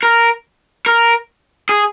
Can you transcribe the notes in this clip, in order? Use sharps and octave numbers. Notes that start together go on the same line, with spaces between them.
A#4
A#4
G#4